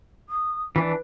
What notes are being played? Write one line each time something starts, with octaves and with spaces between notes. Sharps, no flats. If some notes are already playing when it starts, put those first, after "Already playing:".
D#6
E3 D4 B4